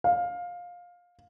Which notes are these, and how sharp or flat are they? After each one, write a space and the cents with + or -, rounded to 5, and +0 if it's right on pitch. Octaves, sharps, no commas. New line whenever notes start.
F5 +15